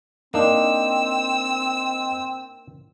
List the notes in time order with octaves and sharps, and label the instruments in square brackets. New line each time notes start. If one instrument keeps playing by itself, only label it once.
[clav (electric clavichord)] A#3 D4 [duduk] C4 [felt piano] D#4 [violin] E6